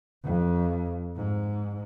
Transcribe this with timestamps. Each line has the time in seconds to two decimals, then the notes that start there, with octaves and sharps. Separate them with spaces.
0.25 F2
1.17 G#2